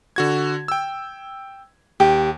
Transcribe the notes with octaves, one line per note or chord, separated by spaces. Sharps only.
D3 F#4 G#6
G5 E6
D#2 G4